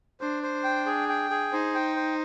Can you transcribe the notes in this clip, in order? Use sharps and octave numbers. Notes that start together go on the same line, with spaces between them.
D4 C5
C5
G5
G#4
G5
G#4
D#4 C5
G5
C5